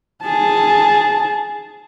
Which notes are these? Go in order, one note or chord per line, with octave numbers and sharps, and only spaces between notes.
G#4 A5